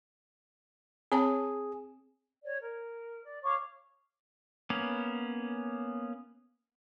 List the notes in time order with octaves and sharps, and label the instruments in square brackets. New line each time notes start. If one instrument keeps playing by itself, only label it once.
[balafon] C4 C#5 A5 [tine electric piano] G#4
[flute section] C#5 D5
A#4
D5
C#5 F5 C#6 D6
[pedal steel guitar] A#3 B3 C#4